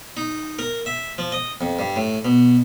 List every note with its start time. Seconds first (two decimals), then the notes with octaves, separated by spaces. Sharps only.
0.17 D#4
0.59 A#4
0.86 E5
1.18 F3
1.32 D#5
1.61 F2
1.79 G2
1.96 A2
2.25 B2